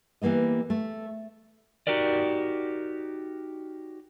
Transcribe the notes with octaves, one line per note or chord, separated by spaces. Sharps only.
E3 G3 A#3 B3 D#5
A3
D#4 F#4 G4 A#4 D5